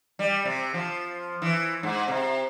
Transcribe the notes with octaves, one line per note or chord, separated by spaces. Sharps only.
G3
C3
F3
E3
G#2
C3